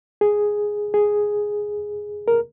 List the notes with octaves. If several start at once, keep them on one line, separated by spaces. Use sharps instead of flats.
G#4
G#4
A#4